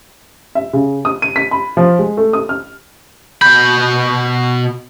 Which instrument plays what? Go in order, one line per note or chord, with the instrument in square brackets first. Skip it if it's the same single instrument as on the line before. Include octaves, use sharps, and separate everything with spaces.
[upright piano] E5
C#3
D#6
D#7
B6
B5
F3
G#3
A3
D#6
F6
[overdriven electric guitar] B2 B5 [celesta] G6